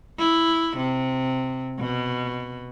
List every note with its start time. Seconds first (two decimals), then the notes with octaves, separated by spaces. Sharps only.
0.18 E4
0.77 C3
1.80 B2